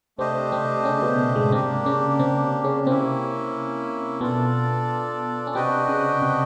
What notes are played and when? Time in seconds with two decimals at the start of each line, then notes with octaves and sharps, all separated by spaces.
0.18 C3 A3 C4 D4 G4 C5 D#5
0.52 C3 C4
0.85 C#3 C#4
1.02 B2 B3
1.36 G#2 G#3
1.52 C3 A#3 C4 D4 G4
1.86 C#3 C#4
2.19 C3 C4
2.64 C#3 C#4
2.87 C3 A#3 C4 C#4 E4
4.21 B2 B3 D4 F4 A4 D5
5.47 C#4
5.55 C3 C4 D4 F#4 B4 D#5 G5
5.88 C#3 C#4
6.22 C3 C4